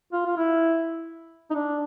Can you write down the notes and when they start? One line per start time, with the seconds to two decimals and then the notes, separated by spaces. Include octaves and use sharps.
0.13 F4
0.26 F4
0.37 E4
1.51 D#4
1.55 D4